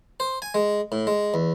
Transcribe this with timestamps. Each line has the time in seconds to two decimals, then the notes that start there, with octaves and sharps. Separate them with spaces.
0.20 C5
0.42 G#5
0.54 G#3
0.92 A2
1.07 G#3
1.34 E2